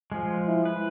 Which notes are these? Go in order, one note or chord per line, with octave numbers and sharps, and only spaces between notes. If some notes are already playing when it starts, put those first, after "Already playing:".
F3 G#3
E4
B4